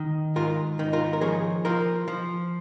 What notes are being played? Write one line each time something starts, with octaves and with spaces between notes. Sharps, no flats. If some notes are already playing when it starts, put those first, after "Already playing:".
Already playing: D#3
G#2 F4 A#4
D#3
F4 A#4
A#4
F3 G#4 C#5
F3 F4 A#4
F3